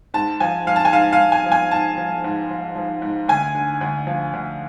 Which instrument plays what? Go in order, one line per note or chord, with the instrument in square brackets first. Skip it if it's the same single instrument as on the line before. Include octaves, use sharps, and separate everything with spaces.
[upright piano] G#2 A5
F3 G#5
F3 F5
A5
G#5
G#2 F5
F5
G#2
G#5
F3
G#5
G#2 A5
F3
G#2
F3
F3
G#2
D2 G#5
D3
D2
F3
D2